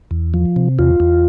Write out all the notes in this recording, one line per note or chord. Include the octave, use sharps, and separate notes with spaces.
E2
F3
C3
E2 F4
E2